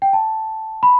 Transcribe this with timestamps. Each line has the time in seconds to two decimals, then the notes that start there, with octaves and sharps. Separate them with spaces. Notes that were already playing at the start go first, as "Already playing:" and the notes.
0.02 G5
0.13 A5
0.83 B5